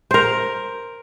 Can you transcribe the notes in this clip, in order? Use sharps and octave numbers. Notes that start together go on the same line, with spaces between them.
A#4 C5